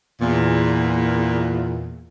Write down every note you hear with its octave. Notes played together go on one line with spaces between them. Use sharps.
E2 A#2